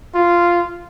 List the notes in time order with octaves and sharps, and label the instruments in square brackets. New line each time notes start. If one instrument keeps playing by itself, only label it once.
[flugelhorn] F4